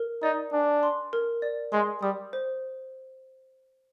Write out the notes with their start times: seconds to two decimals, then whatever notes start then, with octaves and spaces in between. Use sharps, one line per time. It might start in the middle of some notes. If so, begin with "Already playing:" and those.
Already playing: A#4
0.23 D#4 D5
0.53 D4 G#5
0.83 C6
1.13 A#4
1.42 D5
1.72 G#3 C6
2.02 G3 D#6
2.33 C5